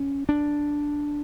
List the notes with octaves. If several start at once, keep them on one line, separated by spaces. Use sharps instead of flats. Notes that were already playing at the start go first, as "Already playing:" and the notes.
Already playing: C#4
D4